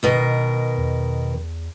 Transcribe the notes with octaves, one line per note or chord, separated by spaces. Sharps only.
F#1 B2 D#3 A#4
E1
E2